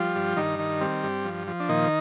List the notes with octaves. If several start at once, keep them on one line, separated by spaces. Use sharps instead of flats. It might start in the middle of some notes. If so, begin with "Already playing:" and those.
Already playing: F3 G3 F4
G2
G2 D#3 D#4
D#3
G3 C4
G2
F3
F3
D4
A#2 D#3 D#4